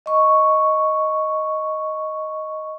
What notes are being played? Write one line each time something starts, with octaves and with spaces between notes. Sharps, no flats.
D#5 C#6